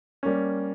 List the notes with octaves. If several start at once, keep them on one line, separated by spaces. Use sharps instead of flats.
G3 A#3 C#4